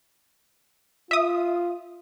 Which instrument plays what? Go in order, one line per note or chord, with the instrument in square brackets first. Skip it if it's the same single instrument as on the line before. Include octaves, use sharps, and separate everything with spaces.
[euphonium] F4 [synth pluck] E5 D#6